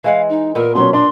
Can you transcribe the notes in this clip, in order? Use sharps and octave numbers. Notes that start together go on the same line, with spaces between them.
E3 G#3 F5 F#5
D#4
A#2 B3 A#4
B2 F#3 C#4 C6
D4 C6